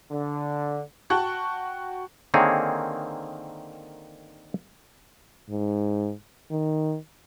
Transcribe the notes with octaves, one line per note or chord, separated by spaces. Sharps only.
D3
F#4 G5 A5 C#6 F#6
D3 D#3 A#3 C4 G#4 C#5
G#2
D#3